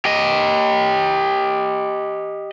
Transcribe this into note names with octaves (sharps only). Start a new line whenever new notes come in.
G4 D#5